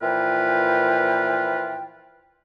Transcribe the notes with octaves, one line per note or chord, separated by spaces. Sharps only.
A#2 E3 F3 F4 B4 G5